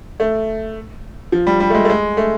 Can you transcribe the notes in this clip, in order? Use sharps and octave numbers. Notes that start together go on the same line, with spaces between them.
A3
F3
G3
G3
A3
G#3
A3
G#3
A3